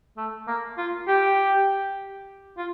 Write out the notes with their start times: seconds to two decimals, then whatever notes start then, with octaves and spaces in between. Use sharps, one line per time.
0.17 A3
0.48 A#3
0.78 F4
1.07 G4
2.57 F4